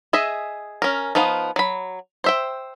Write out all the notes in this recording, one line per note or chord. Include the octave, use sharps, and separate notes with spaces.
G#4 D#5 E5
C#4 A#4
F3 B3 D#4 F5
F#3 B5
C5 E5 G5